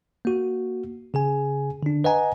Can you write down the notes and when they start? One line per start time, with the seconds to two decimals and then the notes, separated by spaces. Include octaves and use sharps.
0.25 A#3 F#4
1.14 C#3 G#4 G#5
1.83 D3 D4
2.04 B4 D#5 F#5 G#5 A#5